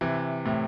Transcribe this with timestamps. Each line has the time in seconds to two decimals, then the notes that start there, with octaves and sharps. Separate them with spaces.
0.01 C3 E3
0.46 A2 C3